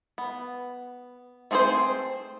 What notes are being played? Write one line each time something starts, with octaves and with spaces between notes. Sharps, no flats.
B3
A3 C4 G#4 A4 C5